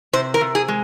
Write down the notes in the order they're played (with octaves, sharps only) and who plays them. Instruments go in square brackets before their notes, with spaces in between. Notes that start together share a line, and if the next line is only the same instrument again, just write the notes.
[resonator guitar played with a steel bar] C3 C5
A#4
C3
G#4
G#3